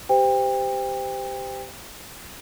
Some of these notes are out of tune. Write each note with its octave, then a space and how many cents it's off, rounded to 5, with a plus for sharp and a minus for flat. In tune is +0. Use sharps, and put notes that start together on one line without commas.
G4 +0 C5 -30 G5 +30